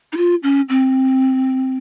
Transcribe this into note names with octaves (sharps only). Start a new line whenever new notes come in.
D#4
F4
C#4
C4